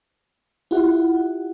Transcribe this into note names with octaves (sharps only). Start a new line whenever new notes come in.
E4 F4 G4 F#5